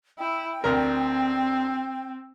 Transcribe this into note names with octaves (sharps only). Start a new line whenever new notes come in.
E4 G5
D2 C4 A#4